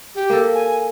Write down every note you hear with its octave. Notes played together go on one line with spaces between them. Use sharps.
G4
A#3 A4
G#5